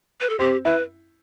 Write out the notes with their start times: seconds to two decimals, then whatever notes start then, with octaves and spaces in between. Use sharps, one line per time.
0.21 B4
0.30 A4
0.39 C4 G4
0.65 E4 B4